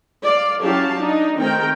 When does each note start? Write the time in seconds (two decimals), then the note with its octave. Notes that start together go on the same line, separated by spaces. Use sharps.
0.24 D5 F5
0.61 F#3 C#4 E4 G4 F5 A5
0.98 D4 D#4
1.38 D#3 A3 C4 A#4 G5